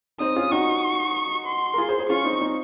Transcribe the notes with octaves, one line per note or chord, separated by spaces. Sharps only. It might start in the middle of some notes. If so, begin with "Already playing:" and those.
C4 D#4 D#6
C#4 F4
D#4 F#4 C#6
C6
A#4
F4 G#4
G#4 C5
G#4 C5
C#4 F4 C#6
C4 D#4
C4 D#4